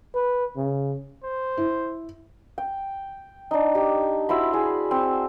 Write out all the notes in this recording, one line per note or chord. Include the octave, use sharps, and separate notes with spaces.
B4
C#3
C5
E4
G5
D4 D#4
G4
E4 F#4 C5 B5
E4 G#4
C4